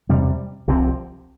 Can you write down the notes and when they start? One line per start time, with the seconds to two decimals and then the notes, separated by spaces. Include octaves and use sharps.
0.09 E2 C3 G3
0.68 C2 C3 F3 C4